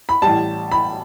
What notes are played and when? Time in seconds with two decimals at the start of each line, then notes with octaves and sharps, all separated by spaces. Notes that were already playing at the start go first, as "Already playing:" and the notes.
0.09 B5
0.22 A1 A2 G3 A5
0.71 B5